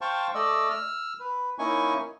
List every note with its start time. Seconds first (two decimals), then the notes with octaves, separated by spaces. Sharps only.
0.01 C5 F5 G5 A5 C#6
0.35 A3 D5 D#5 E6
0.70 E6 F6
1.20 B4
1.59 A#3 C#4 D#4 E4 G#5 C#6